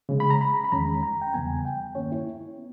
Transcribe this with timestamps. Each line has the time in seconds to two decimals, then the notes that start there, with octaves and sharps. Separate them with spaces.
0.09 C#3 G#3 C#4
0.20 B5
0.30 A#5
0.41 B5
0.64 B5
0.72 E2 D#3 G#3 C#4 A#5
1.03 A#5
1.21 G5
1.34 E2 C#3 G3 B3 G#5
1.65 G5
1.95 G2 D#3 A#3 C#4 C#5
2.12 E4
2.58 B3